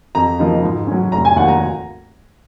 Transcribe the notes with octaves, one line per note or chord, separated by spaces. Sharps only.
F2 A#5
C#3 F3 A#3 D#4
G#2
F#3 C#4
F1 A#5
G#5
D#2 D#3 F#5
A#5